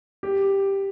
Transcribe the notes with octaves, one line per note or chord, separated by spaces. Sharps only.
G4